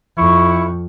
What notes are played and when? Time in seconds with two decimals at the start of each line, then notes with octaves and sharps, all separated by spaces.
0.17 F2 E4 C#6